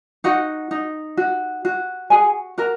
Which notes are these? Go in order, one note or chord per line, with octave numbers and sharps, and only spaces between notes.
D#4 F#4 F#5
D#4
F#4
F#4
F#4 G#4 G#5
F#4 A#4 A#5